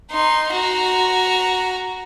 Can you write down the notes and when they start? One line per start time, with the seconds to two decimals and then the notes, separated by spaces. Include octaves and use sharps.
0.11 D#4 C6
0.53 F#4 A#5